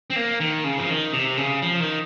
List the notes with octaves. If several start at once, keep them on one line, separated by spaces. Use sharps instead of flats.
C4
A#3
D#3
C#3
F3
D#3
C3
C#3
F3
D#3